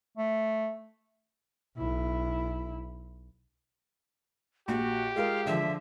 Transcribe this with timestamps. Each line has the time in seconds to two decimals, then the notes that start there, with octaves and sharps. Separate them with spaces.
0.18 A3
1.77 B1 E4
4.68 A#1 F#4 G4
5.16 G#3 F4 A#4 F5
5.47 D3 F3 E5